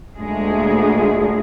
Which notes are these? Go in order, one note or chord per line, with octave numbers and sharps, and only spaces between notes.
D2 A#2 G#3 A3 G#4